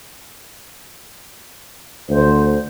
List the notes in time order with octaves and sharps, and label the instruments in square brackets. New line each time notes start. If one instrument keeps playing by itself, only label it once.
[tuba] D2 [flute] C5